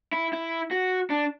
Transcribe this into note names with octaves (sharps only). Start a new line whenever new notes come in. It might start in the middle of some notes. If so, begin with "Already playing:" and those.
E4
E4
F#4
D4